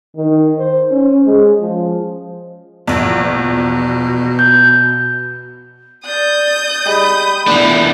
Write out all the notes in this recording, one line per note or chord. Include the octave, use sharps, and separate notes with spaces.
D#3
C5
C#4
G#3
F3
A#1 E2 B2
G6
D5 D#6 G6
G3 D#4 G#4 B5
A#2 D3 E3 B3 D4